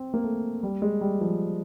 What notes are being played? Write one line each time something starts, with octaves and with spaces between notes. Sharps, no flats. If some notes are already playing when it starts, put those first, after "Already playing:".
Already playing: C4
A#3
A3
G3
G#3
G3
F3